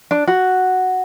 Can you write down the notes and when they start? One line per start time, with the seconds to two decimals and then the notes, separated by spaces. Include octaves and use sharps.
0.11 D4
0.27 F#4